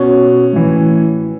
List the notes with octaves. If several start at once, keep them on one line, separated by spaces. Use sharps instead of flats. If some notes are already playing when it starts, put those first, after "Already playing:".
Already playing: B2 C#4
A2 E3